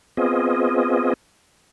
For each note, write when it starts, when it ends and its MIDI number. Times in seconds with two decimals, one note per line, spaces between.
0.17 1.13 59
0.17 1.13 60
0.17 1.13 65
0.17 1.13 68
0.17 1.13 75